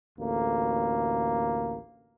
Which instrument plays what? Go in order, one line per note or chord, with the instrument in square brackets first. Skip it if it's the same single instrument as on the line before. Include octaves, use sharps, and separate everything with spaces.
[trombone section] A1 D2 A#3